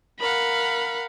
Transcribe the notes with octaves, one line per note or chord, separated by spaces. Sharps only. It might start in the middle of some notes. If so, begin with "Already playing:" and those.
A#4 F5 F#5 B5